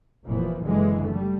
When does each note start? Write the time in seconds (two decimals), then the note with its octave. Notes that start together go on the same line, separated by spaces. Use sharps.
0.25 F1 A#2 E3 F3
0.63 F#1 D3 E3 G#3
1.07 G3 A3